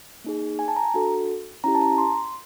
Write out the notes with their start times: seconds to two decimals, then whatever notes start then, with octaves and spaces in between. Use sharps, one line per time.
0.24 A#3 D#4 G#4
0.59 G#5
0.68 A5
0.76 A#5
0.94 D4 F#4 A4
1.64 C#4 E4 G4 A#5
1.75 A5
1.81 A#5
1.98 C6